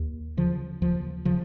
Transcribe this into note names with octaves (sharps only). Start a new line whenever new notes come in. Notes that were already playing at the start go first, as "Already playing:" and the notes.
Already playing: D#2
C#3 F3
D#2 F3
C#3 F3